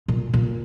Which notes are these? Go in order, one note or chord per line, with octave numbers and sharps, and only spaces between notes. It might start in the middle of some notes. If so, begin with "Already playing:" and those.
A#2
A#2